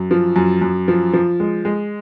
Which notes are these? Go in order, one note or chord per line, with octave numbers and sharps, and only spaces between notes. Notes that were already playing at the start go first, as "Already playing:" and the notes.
Already playing: F#2
F3
F#2
F#2
F3
F3
G#3
G#3